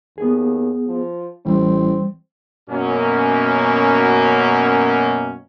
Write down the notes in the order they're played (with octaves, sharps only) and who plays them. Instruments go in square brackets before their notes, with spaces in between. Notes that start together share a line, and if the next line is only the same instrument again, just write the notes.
[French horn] D#2 [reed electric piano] B3 G#4
[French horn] F3
[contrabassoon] A1 [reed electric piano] E3 G3 [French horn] C4
[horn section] F#2 B2 A#3 C#4